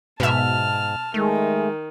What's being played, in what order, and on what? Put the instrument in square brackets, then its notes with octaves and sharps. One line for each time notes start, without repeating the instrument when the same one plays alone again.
[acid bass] G#2 [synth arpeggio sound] B2 E5 [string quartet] A5 F6
[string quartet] D#3 [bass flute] G#3 [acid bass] A3